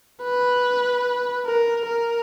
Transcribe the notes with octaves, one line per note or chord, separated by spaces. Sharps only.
B4
A#4
A#4